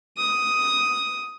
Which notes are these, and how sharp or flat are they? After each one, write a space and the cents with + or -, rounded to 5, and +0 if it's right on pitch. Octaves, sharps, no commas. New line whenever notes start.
D#6 +5